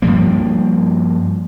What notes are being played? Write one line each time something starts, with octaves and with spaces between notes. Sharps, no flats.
G2 F3 G3 A#3